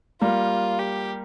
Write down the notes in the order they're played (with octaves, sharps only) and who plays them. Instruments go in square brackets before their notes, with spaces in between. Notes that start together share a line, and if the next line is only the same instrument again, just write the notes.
[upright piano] G3 A#3 [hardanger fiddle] F4
[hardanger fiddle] G4